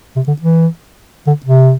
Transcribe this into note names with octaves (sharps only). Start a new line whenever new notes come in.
C3
D3
E3
D3
C3